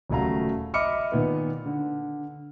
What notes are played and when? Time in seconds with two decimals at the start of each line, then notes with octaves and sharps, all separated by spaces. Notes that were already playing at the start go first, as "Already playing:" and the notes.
0.09 D#1 C#3 F#3 A3 F5 A#5
0.74 D#5 E5 B5 D6 F6 C#7
1.12 A#2 D#3 B3
1.66 D3